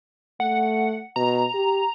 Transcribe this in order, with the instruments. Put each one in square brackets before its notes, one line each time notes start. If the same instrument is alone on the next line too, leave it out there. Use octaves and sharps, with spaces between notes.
[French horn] A3 [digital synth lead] F#5
[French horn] B2 [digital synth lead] A#5
[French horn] G4